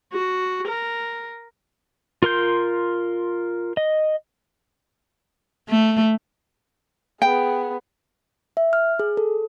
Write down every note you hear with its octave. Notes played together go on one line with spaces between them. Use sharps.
F#4
A#4
F4 A#4 C6 G6
D#5
A3
B3 G#4 G5
E5
F6
G#4
A4